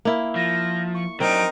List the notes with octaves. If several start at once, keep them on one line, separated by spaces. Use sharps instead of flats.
A#3 E4
F3 A#6
C#6
F#3 C4 D4 D#4 A#4 C5 D7